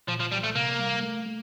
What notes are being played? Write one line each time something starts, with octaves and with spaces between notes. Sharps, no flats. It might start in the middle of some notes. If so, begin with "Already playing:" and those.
A#2 F3
F3
C2 G3
A3
C3 A#3
G3
A3
A3